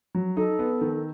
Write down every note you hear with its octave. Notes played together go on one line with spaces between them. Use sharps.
F#3
D#4 A4
B3
D#3